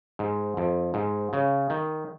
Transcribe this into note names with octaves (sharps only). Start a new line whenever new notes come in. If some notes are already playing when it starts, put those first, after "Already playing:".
G#2
F2
G#2
C#3
D#3